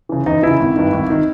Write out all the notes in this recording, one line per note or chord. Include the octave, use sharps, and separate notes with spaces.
C#3 E3
E2 D#4
C#3 E3 E4
G#1
G2 D#3
G#1
D#3